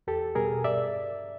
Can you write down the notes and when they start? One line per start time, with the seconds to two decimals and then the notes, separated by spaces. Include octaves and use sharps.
0.07 E2 G4 A4
0.35 B2 G3 G#4 A#4
0.64 G2 D5 E5